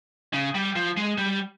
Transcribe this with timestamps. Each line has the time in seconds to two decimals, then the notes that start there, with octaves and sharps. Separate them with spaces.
0.33 C#3
0.55 G3
0.75 F3
0.97 G#3
1.18 G3